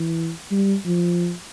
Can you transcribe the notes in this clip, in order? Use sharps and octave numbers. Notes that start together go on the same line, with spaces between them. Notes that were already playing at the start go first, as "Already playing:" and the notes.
Already playing: E3
G3
F3